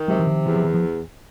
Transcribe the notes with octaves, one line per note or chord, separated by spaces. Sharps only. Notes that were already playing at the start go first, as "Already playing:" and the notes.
Already playing: D#3
C3 F#3 G#3
E3
D#3 F3
E2 E3
F3
E3
F3